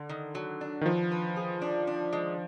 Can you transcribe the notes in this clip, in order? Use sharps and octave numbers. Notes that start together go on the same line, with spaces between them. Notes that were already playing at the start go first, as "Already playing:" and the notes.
Already playing: D3
D#3
F#3
D4
D#3
F3 B4
B4
G#4
D4
D4
G#3